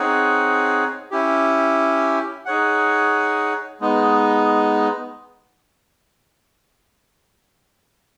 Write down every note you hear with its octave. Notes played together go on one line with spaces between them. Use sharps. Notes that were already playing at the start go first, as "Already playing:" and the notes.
Already playing: C4 D#4 G#4 C#5 F#5
C#4 E4 G4
D#4 G#4 C#5 F#5
G#3 B3 D#4